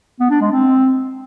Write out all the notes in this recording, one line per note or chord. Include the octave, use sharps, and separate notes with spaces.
B3
D4
G#3
C4